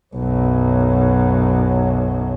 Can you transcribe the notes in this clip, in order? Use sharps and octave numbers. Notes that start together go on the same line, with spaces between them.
B1 F#2